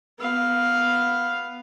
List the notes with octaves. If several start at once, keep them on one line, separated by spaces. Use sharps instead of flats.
B3 F5